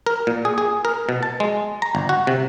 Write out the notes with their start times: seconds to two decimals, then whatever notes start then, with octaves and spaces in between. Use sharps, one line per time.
0.07 A#4
0.27 A#2
0.45 G#4
0.58 G#4
0.85 A#4
1.09 B2
1.23 A5
1.40 G#3
1.82 A#5
1.95 G1
2.09 F#4
2.27 C3